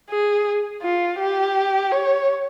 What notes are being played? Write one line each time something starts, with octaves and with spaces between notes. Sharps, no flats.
G#4
F4
G4
C#5